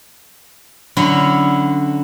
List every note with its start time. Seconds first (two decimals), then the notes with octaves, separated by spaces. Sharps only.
0.97 D3 F#3 C#4 E4